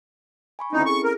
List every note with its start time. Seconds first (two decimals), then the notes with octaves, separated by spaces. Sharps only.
0.59 G#5 B5 C#6
0.73 D2 C4 C#4 D#4 E4
0.86 G#4 A4 C#6
1.04 A#4